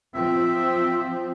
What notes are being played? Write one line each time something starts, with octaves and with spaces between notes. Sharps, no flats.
F3 C4 F4 E5